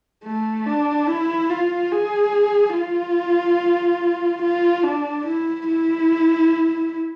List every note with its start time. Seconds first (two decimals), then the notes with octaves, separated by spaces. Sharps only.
0.24 A3
0.66 D4
1.07 E4
1.50 F4
1.91 G#4
2.74 F4
4.41 F4
4.83 D4
5.25 E4
5.67 E4